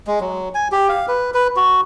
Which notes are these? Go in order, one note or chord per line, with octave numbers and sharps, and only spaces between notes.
G#3
F#3
G#5
G4
F5
B4
B4
F#4